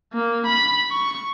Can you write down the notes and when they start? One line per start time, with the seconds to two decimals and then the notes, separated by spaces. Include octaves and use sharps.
0.14 A#3
0.46 B5
0.92 C#6